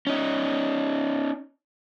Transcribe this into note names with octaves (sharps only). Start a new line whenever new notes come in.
C#4 D#4